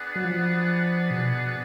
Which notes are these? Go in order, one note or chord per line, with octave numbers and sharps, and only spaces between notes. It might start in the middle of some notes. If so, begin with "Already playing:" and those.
Already playing: B3 D4 G#4 B4 F#5
F#3
F3
B2